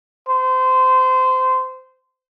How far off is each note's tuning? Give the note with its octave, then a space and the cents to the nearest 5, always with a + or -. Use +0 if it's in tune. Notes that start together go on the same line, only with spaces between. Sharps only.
C5 -25